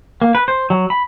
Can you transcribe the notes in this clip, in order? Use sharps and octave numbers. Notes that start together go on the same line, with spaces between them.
A#3
B4
C5
F#3
B5